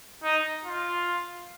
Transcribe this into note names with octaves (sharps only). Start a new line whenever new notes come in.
D#4
F4